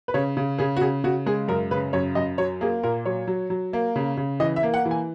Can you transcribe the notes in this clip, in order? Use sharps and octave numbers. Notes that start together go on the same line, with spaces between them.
B4
C#3 C#5
C#3
C#3 G#4
F#4
C#3 G#4
C#3 F#4
G#3 G#4
F#2 A#4
C#3 B4
F#2 C#5
F#2 D#5
F#3 C#5
A#3 G#4
A#2 A#4
F#3 C#5
F#3
F#3
A#3
C#3
C#3
E3 D#5
E5
A#3
F#5
E3
G#5